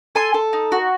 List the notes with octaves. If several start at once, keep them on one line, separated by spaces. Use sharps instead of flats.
A4 G#5 C6
A4
D#4
F#4